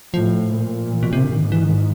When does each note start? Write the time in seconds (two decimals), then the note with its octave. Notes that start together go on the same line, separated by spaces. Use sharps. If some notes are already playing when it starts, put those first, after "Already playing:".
0.14 A2 F3
0.54 A#2
0.92 E3
1.03 B2
1.13 C3
1.23 D3
1.32 G#2 D#3
1.52 E3
1.62 D#3